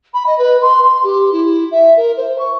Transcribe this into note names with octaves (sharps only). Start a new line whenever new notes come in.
B5
D#5
B4
C6
C6
G4
E4
E5
A#4
C5
C#6